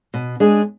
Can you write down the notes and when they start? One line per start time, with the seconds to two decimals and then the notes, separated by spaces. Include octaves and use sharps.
0.14 B2
0.40 G#3 D4 G#4